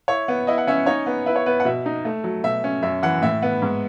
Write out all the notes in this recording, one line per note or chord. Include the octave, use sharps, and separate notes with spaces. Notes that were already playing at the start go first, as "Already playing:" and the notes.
E4 C#5
B3
E4 D#5
F#5
C#4 E5
D#4 C#5
B3
E4 B4
C#5
B3 B4
F#5
B2 E5
D#4
A3
F#3
B2 E5
C#4
F#2 E5
E3 F#5
A2 E5
B3
G#2